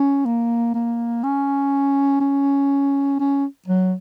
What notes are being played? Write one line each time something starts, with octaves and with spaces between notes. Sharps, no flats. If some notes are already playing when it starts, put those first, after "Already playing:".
Already playing: C#4
A#3
A#3
C#4
C#4
C#4
F#3